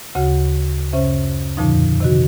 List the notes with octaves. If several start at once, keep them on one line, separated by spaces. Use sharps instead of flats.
D2 C#3 F#4
F#2 C#3 C#4 C5 E5
F2 A#2 D3 F3 D#4
C3 D#3 F#4